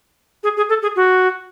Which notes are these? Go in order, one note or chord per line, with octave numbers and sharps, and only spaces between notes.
G#4
G#4
A4
G#4
F#4